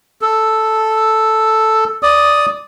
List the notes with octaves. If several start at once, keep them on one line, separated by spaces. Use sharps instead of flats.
A4
D5 D#6